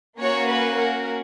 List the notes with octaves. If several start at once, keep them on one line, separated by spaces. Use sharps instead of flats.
A#3 C#4 F#4 C#5
B4
A#4